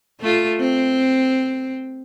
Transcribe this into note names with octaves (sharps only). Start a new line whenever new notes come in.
A3 F4
C4